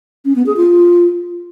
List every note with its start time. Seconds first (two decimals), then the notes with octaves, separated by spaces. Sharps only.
0.25 C#4
0.36 B3
0.46 G#4
0.57 F4